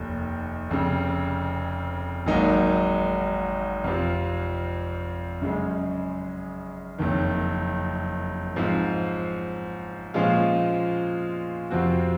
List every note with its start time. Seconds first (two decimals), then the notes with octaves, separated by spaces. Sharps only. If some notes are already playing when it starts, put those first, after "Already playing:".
Already playing: F1 D#2
0.70 F1 F2 C#3
2.27 G#1 G#2 F#3 A#3 D#4
3.84 F2 C3 F3
5.42 F#2 C#3 G#3
6.98 F#1 F2 D#3
8.56 G#2 F3 C4
10.14 A#2 F3 G#3 C#4 F4
11.70 F2 C3 F3 C4 F#4